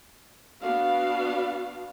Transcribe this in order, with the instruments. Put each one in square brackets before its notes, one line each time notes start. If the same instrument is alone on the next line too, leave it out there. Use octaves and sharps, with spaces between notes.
[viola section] B3 D4 F#4 F5